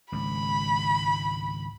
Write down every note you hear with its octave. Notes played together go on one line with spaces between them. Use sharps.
G#1 C#2 B5